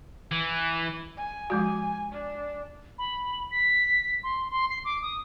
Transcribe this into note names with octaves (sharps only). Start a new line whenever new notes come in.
E3
G#5
F3 G#3 F#4
D4
B5
B6
C6
C6
C7
D6
D#6